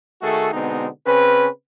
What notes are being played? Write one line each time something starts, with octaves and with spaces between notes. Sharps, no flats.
D#3 A3 F#4 G#4 A4
B2 D3 G#3 B3 C4 D#4
C#3 C4 C#4 B4